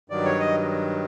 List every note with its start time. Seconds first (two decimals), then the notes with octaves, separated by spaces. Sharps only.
0.10 G2 D#3 F#3 D5
0.26 C#5
0.40 D#5